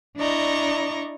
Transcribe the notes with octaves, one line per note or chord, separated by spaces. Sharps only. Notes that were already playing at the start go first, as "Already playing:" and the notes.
D4 E4 D5 D#5 A#5 C#6